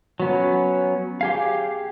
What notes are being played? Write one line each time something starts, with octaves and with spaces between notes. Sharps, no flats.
F#3 B3 C#4
G4 G#4 F5